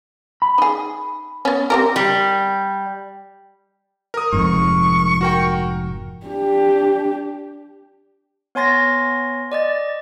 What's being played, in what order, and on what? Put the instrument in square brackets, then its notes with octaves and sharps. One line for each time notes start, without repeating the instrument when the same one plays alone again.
[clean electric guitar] B5
[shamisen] D#4 G#4
B3 C#4
C4 G4 A#4
[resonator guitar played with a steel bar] G3
[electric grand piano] A#4 D#6
[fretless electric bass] F1 F2 G#2 [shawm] C#6
[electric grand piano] F#4 A#4 G5
[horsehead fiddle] D4 G4
[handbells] B3 C#5 G#5 C6 A6 A#6
D5 D#5 A6